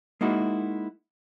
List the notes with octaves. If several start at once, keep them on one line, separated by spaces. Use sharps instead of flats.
G#3 A#3 D#4 E4 F#4